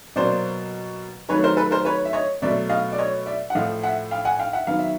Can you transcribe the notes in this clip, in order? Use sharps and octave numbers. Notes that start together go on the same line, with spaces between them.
B2 F#3 A#3 C5 D5
D#3 F#3 A3 B4 C#5
A#4 C5
A4 B4
A#4 C5
B4 C#5
E5
C#5 D#5
B2 F#3 A3 D5 E5
D#5 F5
D5
C#5 D#5
D5 E5
F#5
A2 F3 A3 D#5 F5
E5 F#5
F5 G5
F#5 G#5
F5 G5
E5 F#5
D#3 F#3 B3 F5
E5